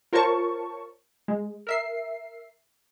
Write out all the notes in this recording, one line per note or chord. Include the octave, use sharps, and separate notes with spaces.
F4 A#4 C5 C#5 A5 C#6
G#3
A#4 E5 C7